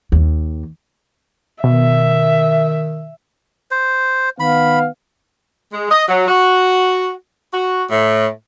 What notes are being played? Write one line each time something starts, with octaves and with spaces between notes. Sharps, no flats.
D#2
B2 D#3 E5
C5
D#3 B3 F5 B5
G#3
D#5
F#3
F#4
F#4
A2